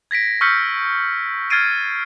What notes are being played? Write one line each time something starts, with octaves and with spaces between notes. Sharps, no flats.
G#6 A#6 B6 D7
C#6 E6 F6 G6 B6 C#7
F6 G#6 A6 C7 D7 D#7